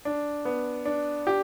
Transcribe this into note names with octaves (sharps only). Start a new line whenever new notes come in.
D4
B3
D4
G4